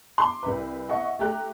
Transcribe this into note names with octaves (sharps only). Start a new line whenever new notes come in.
C6 D6
C2 B4
D#5 E5 F#5 C#6
A3 G4 A#5 F#6